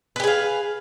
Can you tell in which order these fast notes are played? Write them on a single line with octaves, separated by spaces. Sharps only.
B4 G4 G#4 F5